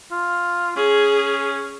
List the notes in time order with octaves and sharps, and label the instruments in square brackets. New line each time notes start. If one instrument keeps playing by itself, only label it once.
[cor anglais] F4
[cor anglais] C#4 [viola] G#4